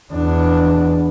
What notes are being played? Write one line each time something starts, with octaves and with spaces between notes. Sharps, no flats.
E2 D4